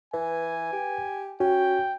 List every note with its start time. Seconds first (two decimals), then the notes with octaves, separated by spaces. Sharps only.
0.14 E3 B4 G#5
0.73 G4
1.40 C#4 F#4 G5